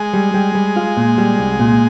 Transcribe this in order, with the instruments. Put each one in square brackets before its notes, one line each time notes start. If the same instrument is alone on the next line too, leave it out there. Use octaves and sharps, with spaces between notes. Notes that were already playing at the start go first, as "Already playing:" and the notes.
Already playing: [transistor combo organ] G#3
[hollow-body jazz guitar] G3
G3
G3
F4
A#2
G3
C2
A#2